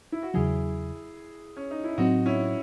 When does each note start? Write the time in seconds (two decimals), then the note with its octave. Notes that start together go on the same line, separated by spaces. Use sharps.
0.12 E4
0.23 F#4
0.34 E2 C#3 F#3 E4 G#4
1.57 C#4
1.71 D#4
1.84 E4
1.98 A2 F#3 C4 D#4 F#4
2.26 C#4 E4